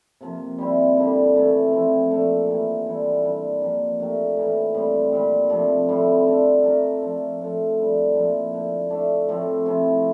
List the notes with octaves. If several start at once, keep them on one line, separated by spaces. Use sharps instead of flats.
C3 F3 A#3
G3 C4 E4
D3 G3 D4
C3 E3 A3
F3 C4 E4
A#2 A3 D4 A4
E3 A#3 E4 G4
E3 G3 D4 A4
A#2 G3 D4
F3 A#3 D4 G4
A3 D4 G4 A#4
A2 E3 A#3
A2 G3 C4
A#2 G3 C4
C3 F3 A3 D4
A2 G3 C4 E4
G3 D4 A4
A3 D4 F4 A#4
F3 A3 D4
A2 F3 A3
D3 G3 D4
A#2 F3 A#3 E4
D3 A3 D4
A3 D4 A4
A2 F3 A3 C4
C3 F3 C4 E4